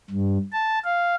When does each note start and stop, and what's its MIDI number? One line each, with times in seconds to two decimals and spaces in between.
0.10 0.38 43
0.52 0.79 81
0.84 1.15 77